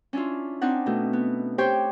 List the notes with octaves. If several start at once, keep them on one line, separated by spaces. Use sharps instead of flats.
C#4 D4 E4 F4
C4 D4 D#4 F#5
B2 A3
B3
G4 C5 C#5 G5